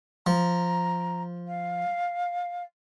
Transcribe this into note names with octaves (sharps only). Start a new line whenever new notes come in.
F3 A#5
F5